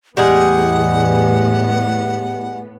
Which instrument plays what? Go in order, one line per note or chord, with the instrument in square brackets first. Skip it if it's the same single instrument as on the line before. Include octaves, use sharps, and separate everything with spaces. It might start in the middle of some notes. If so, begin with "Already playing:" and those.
[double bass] E2 [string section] A2 B3 [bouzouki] G3 G#3 G#4 [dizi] F#5